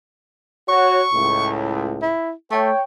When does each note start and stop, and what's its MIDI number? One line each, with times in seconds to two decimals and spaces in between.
0.69 1.04 66
0.69 1.04 73
0.69 1.51 85
1.13 2.13 37
1.13 2.13 45
2.02 2.32 64
2.51 2.71 57
2.51 2.82 73
2.51 2.82 79